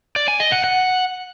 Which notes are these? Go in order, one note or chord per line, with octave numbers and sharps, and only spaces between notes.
D5
G#5
D#5
F#5
F#5